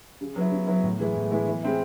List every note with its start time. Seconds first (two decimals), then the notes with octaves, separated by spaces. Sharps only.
0.21 C#3
0.36 F#3 B3 E4
0.52 C#3
0.67 F#3 B3 E4
0.83 A2
0.99 E3 G#3 B3 E4
1.15 A2
1.31 E3 G#3 B3 E4
1.46 E3
1.63 G#3 C4 E4